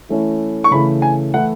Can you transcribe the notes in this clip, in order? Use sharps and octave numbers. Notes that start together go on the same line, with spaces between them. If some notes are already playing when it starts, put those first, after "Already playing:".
E3 A3 C#4 E4
C#6
C#3 E3 A3 B5
G#5
E3 A3 E4 F#5